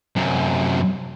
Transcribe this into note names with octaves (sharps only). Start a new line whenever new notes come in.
F#2 C3